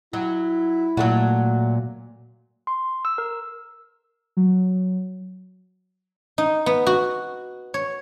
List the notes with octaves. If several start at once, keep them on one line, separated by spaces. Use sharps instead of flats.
F#3 E4
A#2 F#3 A3 F#4
C6
E6
A#4
F#3
D#4
B3
F#4
C#5